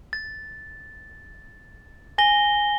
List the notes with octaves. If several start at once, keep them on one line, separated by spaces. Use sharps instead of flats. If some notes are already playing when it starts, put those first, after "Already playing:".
A6
G#5 A#6 G7